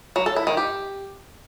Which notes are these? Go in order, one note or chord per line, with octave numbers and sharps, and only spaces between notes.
F#3
A4
E4
D#3
G4